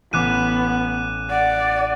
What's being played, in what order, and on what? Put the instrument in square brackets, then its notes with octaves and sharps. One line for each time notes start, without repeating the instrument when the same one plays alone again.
[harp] A1 [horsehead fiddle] B3 [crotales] D6 F#6 D#7
[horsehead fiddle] D5 [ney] F#5